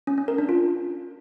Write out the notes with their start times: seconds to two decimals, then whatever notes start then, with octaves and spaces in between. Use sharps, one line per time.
0.07 C#4
0.18 C#4
0.28 A#4
0.38 D4
0.49 F4